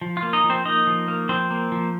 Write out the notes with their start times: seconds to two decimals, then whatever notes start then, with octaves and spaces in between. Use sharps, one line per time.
0.01 F3
0.17 F4
0.22 A#3
0.33 D#4 D#5
0.44 F3
0.50 C4 C5
0.65 A#3 D#4 D#5
0.87 F3
1.08 A#3
1.29 F3 C4 C5
1.51 A#3
1.72 F3